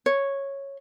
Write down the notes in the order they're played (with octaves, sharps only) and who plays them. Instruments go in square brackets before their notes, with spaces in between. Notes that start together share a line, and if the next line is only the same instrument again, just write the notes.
[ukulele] C#5